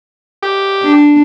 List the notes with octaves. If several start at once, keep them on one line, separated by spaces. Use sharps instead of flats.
G4
D4